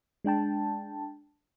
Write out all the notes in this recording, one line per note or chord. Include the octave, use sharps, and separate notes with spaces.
G#3 D4 G5 A5